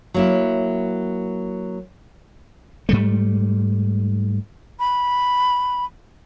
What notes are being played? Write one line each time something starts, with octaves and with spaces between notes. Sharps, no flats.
F#3 A#3 E4
G#2 G3 A3
B5